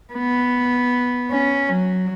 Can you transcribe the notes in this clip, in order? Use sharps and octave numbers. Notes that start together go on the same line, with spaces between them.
B3
C#4
F#3